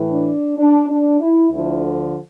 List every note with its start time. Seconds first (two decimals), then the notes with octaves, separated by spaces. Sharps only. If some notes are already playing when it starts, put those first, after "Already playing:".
Already playing: A2 E3
0.12 D4
0.58 D4
0.89 D4
1.20 E4
1.51 D2 D3 F3 E4